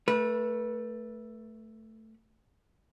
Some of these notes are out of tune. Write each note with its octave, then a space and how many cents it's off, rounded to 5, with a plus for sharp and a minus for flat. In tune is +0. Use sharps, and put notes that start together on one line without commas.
A3 +5 B4 -30